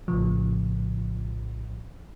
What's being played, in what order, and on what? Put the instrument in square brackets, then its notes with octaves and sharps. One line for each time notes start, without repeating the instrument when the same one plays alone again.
[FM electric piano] A#1 A2 C#3 F3